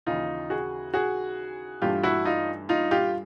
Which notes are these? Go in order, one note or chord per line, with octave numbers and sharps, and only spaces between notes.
D#2 C#3 E3 D#4 F4
F#4 G#4
F#4 G#4
G2 E3 A3 F4 G4
E4 F#4
D#4 F4
D#4 F4
F4 G4